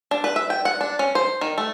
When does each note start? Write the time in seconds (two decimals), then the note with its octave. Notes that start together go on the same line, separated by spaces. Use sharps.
0.11 D4
0.24 B4
0.36 E5
0.50 G5
0.65 F#5
0.81 D4
0.99 C#4
1.15 C5
1.41 D#3
1.58 A3